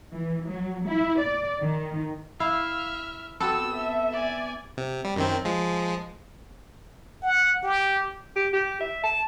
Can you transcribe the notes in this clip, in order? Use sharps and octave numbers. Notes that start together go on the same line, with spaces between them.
E3
F#3
E4
D5
D#3
E4 E5 F5 F6
B3 C4 F#4 A4 E6
E5
D5 G#5
C3
G3
F#2 D#3 C4
F3 G#3
F#5
G4
G4
G4
E5
A5